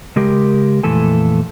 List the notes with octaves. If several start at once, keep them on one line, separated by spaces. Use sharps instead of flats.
C#3 G#3 G4 A#4
F2 A#2 E3 A3 A4 G#5